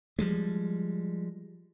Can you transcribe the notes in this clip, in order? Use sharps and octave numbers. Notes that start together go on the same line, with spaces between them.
F3 G3 G#3